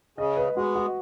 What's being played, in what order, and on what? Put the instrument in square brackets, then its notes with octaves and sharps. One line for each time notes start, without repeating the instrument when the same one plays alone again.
[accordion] C#3 [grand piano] D#5
[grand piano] B4
[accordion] G#3 B3 [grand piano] F#4
[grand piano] F#4